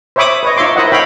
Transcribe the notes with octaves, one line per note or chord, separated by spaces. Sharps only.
C5 C#5 E5 B5 D6 D#6
B4 C#5 D#5
D#4 F4 C#5 E5 C6 D6
E4 A#4 C5 D#5 E5 F#5
D#4 C#5 E5 F5 G5 B5